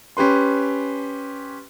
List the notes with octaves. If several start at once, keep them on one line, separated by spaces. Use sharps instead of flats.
C#4 G4 B4 C6